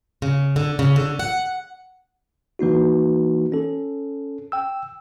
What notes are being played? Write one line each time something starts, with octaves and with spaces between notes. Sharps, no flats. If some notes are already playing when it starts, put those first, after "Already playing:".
C#3
D3
C#3
D3
F#5
E3 A#3 D#4 F#4
C#4 A4
G5 E6